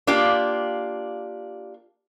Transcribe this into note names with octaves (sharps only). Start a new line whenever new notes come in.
A#3 D4 F4 G4